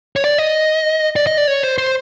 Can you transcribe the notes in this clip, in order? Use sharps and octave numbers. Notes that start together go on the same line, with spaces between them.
C#5
D5
D#5
D5
D#5
D5
C#5
C5
C5